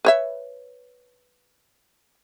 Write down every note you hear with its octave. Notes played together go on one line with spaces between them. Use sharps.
B4 C#5 E5